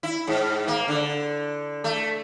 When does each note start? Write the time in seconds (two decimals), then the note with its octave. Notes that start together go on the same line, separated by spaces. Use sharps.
0.03 E4
0.27 G#2
0.68 A#3
0.88 D3
1.84 A3